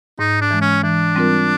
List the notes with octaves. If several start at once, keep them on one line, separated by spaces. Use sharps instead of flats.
G#2 D#4
D4
E3 G#3
C#4
E3 D4
G3 C4 F4 A#4